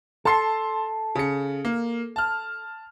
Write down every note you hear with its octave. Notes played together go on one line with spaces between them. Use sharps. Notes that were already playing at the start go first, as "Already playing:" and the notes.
A4 A5 C6 C7
C#3 C#7
A#3
A5 F6